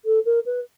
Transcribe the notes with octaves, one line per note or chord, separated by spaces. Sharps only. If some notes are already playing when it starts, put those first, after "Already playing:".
A4
A#4
B4